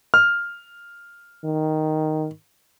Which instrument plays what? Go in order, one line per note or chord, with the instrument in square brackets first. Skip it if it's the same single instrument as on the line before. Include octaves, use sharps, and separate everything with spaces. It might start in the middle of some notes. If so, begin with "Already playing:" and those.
[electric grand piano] F6
[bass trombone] D#3